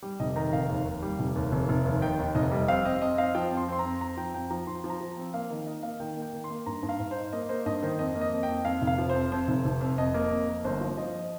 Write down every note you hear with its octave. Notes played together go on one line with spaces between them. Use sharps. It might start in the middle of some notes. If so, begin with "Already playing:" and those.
G3
F1 D#5
D#3 A#5
F1 F5
D#2
D#2
G3
F1
D#2
F1
F1
D#2
D#3 G5
D#2
F1 D#5
G3
C4 F5
C4 D#5
F2 D#5
C4 F5
F3 G5
F2
C6
C4 C6
A#5
F2
C4 A#5
F3 G5
F2 G5
F3 A#5
F3 C6
F3
A#5
F3
C4
A#3 F5
D#3
D#4 D#5
A#3 F5
D#3 G5
A#3
G5
D#3
C6
A#3
G2 A#5
G2
F5
G2
D#4 C5
A#3 D#5
A#3 C5
G2 D#5
D#3 C5
F2 D#5
A#3
D#5
F2
G5
F2
F2 F5
F1
F5
F3
C5
F2
F2 C5
F1
F1
F2
F2 D#5
A#3
F2
A#3
G1 C5
F3
F3 D#5